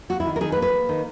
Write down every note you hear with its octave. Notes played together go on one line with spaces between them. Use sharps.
A#3 F#4
E4
D#3
A#4
D#3 G#4
B4
A#3
B4
A#3
D#3